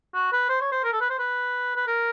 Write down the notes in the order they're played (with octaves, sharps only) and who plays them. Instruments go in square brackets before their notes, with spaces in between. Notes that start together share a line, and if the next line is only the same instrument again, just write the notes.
[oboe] F#4
B4
C5
C#5
C5
A#4
A4
B4
C5
B4
B4
A#4